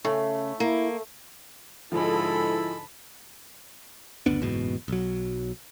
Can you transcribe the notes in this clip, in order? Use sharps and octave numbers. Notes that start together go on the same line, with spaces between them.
C#3 A3
A#3 E4
G#2 D3 F3 G#3 E4 A4 A5 B5
F#1 D2 B3 D4
F#1 E2 G#2 B2
B1 F#3